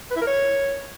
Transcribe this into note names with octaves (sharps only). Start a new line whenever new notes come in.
B4
E4
A#4
C#5